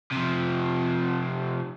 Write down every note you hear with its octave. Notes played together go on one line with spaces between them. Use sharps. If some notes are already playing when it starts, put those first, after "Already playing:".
C3 F3